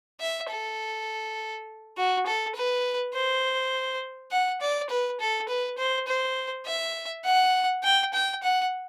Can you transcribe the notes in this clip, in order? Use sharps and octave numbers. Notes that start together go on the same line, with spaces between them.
E5
A4
F#4
A4
B4
C5
F#5
D5
B4
A4
B4
C5
C5
E5
F#5
G5
G5
F#5